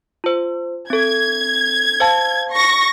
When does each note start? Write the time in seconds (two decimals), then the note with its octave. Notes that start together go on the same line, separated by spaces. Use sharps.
0.24 F4 C5
0.90 C4 A4 G#6
2.00 C5 F5 A5
2.52 C#6 A#6